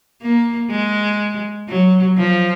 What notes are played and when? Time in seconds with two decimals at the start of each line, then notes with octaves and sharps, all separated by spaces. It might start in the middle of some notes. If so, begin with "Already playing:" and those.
0.22 A#3
0.70 G#3
1.69 F#3
2.17 F3